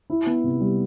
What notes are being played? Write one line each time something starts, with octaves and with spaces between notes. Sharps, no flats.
E4
B3
C3
G3